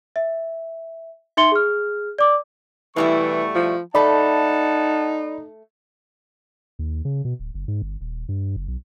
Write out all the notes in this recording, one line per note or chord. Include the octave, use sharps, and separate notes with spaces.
E5
D#4 E5 C6 C#7 G7
G#4 F6
D5 D6
B2 E3 G3 A3 E4 C#6
F3
A3 D#4 A4 D5 F#5 A5 B5
D#2
C#3
B2
D1
F#1
G#2
G1
D#1
G2
F#1
B1